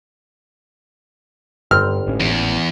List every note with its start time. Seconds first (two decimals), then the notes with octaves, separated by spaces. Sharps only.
1.71 G1 G2 C4 G5 F6
2.06 G#1 A2 C#4
2.20 E2